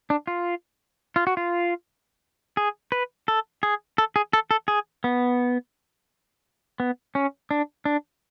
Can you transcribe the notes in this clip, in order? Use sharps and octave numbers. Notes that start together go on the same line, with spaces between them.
D4
F4
F4
F#4
F4
G#4
B4
A4
G#4
A4
G#4
A4
A4
G#4
B3
B3
C#4
D4
D4